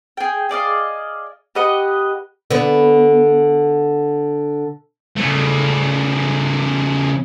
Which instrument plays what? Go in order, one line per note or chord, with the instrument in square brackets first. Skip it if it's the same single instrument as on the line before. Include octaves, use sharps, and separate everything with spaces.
[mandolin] G#4 G5
G#4 D5 D#5 F5
G4 B4 D#5 F#5
[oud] D3 B3
[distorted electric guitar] C#3 A3